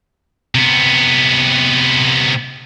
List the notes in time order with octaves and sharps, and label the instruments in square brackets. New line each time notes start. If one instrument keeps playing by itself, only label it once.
[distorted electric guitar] C3 B3